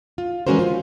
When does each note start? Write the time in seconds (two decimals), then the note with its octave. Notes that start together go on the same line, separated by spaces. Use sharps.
0.18 F4
0.47 E3 G#3 C#4 F#4 A#4 C5
0.59 F4